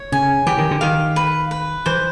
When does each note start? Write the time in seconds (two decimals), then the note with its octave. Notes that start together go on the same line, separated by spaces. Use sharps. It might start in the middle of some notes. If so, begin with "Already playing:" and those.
Already playing: C#5
0.12 C#3 G#5
0.46 E3 G4
0.58 D#3
0.71 D3
0.81 D#3 F5
1.16 B4
1.51 B4
1.86 E3 C5